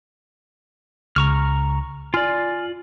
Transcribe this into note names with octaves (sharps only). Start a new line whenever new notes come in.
C#2 C#3 A#5 C#6 F6
F4 D5 G#5 F6